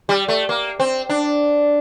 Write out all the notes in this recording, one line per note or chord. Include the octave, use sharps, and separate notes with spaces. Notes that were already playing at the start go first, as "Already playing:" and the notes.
G3
A3
A#3
C4
D4